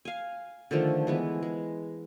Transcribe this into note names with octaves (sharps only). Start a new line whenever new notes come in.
F5 G#5
D3 D#3 F3 A3
E3 G#3 B3
G#3